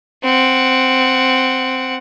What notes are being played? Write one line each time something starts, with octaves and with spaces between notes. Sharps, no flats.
C4 F#5